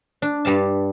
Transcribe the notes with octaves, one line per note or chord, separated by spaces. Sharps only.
D4
G2 G3 F5 A5